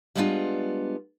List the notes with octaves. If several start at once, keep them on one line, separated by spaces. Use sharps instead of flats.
G3 G#3 B3 D4 D#4 F4